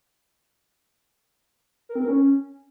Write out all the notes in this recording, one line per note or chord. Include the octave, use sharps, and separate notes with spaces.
A#4
C4
A#4
C#4